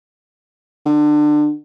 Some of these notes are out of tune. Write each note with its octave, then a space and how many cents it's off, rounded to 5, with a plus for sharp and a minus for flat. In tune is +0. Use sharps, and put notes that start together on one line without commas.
D3 +25